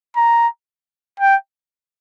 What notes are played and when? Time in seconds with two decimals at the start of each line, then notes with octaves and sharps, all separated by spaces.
0.16 A#5
1.20 G5